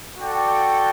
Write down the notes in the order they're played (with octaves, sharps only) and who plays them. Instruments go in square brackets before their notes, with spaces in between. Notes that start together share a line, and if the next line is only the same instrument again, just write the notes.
[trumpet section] F#4 A4 D5 G5